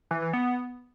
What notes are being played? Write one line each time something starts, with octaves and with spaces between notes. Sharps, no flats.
E3
E3
B3